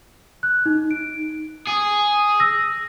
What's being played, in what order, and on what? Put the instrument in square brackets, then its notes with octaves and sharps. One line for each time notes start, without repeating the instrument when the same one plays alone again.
[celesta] F#6
D#4
D7
[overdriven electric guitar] G#4
[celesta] E6 A#6